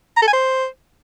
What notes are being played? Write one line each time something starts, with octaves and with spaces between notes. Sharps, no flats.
A#5
A4
G#5
C5